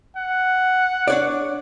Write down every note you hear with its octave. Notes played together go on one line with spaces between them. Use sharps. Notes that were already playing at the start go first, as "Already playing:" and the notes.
F#5
D4 C#5 D5